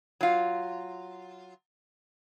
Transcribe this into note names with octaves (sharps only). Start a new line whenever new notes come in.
F#3 F4